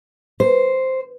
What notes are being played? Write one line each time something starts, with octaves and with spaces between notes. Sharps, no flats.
C5